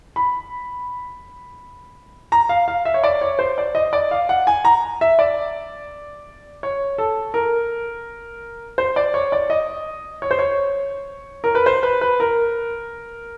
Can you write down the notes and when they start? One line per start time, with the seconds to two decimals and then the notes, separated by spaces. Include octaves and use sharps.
0.16 B5
2.32 A#5
2.49 F5
2.68 F5
2.85 E5
2.94 C#5
3.04 D5
3.21 C#5
3.39 C5
3.58 D5
3.75 D#5
3.93 D5
4.11 F5
4.29 F#5
4.47 G#5
4.65 A#5
5.01 E5
5.19 D5
6.63 C#5
6.98 A4
7.34 A#4
8.78 C5
8.96 D5
9.14 C#5
9.32 D5
9.50 D#5
10.22 C#5
10.31 C5
10.39 C#5
11.44 A#4
11.55 B4
11.66 C5
11.83 B4
12.01 B4
12.20 A#4